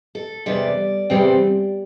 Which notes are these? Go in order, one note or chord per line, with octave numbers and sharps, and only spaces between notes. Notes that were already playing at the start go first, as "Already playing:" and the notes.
A4
E2 C3 G3 D5
E2 C3 G3 C4